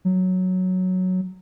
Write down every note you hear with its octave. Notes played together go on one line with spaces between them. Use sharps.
F#3